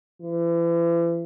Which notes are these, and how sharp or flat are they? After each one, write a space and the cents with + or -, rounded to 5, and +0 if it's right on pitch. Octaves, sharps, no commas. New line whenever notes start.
E3 +40